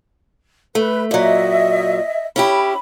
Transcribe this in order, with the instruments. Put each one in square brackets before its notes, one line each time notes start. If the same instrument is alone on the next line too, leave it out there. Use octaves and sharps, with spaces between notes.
[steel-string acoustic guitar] A3 [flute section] B4
[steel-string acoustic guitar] A#2 F#3 [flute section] D#5 E5
[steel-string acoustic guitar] C#4 E4 G4 [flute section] B5